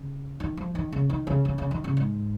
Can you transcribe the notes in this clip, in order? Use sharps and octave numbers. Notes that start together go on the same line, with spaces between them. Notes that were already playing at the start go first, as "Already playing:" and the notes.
Already playing: C#3
D#3
F3
D#3
C#3
D#3
C#3
C#3
C#3
D#3
C#3
G#2